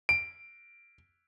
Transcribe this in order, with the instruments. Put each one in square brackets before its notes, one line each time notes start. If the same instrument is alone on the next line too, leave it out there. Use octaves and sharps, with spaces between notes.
[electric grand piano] D7